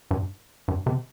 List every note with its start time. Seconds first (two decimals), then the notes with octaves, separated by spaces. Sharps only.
0.11 G2
0.68 G2
0.86 C3